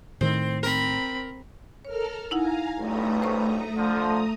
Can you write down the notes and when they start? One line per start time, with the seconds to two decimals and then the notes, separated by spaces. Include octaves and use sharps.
0.21 A2 D#3 C4
0.63 C4 A#4 B5
1.85 A4 A#4 C#5 F6
2.31 D#4 E4 F5 F#5 G#5 A#5
2.78 B1 E2 G2 A3 A#5 D#6
3.22 C5 C#6
3.76 D3 F3